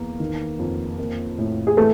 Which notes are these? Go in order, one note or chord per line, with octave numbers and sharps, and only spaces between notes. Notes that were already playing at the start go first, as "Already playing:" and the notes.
Already playing: E2 A#3
D#3
F2
A#3
A2
G#4
E3 A3 A4